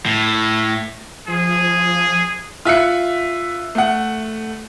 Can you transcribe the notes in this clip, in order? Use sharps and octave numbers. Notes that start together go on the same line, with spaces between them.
A2
F3 G#4
F4 E5 F#6 C#7
A3 F#5